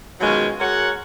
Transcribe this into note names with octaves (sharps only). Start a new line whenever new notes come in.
B2 D#3 F#3 G#3 C#4 F4
G#3 F#4 A#4 C#5 F#5